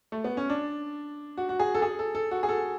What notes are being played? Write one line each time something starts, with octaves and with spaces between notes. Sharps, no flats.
A3
B3
C#4
D4
F#4
F#4
G#4
A4
G#4
A4
A4
F#4
G#4
A4